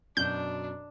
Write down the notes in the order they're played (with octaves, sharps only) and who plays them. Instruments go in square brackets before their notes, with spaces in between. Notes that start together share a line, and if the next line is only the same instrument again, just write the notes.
[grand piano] F#2 B2 [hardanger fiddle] D4 [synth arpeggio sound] G6